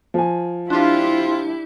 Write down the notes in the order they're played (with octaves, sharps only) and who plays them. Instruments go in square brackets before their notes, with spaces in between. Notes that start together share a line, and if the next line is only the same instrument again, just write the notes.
[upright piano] F3 G#5
[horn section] C4 F4 [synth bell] D4 G4 [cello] E4